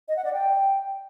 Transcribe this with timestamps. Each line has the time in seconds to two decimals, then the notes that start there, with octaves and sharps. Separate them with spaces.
0.08 D#5
0.16 F#5
0.24 D5
0.33 G5